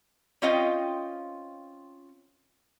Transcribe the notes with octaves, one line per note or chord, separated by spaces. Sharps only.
C4 C#4 F4 D#5 G5